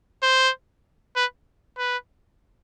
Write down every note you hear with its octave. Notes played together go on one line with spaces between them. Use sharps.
C5
B4
B4